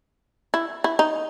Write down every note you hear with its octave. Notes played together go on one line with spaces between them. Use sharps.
E4
E4
D#4